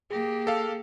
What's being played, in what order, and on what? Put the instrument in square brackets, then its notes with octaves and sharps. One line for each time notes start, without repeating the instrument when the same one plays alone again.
[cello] A#3 G4 [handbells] G#4 A#6
[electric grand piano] A4 F5